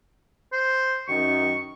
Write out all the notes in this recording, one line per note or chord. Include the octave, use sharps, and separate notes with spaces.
C5
F#2 D#3 C#6